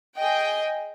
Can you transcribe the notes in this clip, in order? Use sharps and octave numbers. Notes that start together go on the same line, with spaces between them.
G#4 D#5 G5